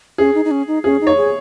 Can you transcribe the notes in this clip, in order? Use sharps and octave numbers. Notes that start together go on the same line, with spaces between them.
C#4 G#4
D#4
D#4
C#4
D#4
C#4 G#4
D#4
C#5
G#4